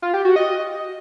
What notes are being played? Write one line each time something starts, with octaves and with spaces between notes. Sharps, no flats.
F4
G4
F#4
D#5